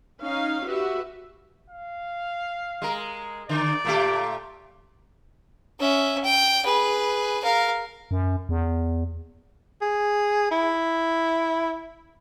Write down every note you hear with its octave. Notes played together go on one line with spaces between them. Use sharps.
C#4 D#4 F5
F#4 G4 B4 E5
F5
G#3 A#4
D3 D5
A#2 A3 G4
C#4 E5
G5
G#4 B4
A#4 F5
F#2
E2
G#4
E4